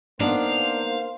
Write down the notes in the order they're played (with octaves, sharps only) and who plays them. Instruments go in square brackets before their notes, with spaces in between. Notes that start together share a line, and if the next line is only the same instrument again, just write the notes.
[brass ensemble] A#3 C5 [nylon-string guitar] B3 D#4 [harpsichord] D4 [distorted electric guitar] F5